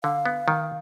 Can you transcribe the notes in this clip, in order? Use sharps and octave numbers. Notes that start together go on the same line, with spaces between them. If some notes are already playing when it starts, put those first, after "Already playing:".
D3 F5
B3
D#3